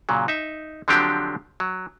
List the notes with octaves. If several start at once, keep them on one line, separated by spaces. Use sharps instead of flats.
A#2 C#3 F#3
D#4 E5
D3 F3 F#3 C4 D4 G4
F#3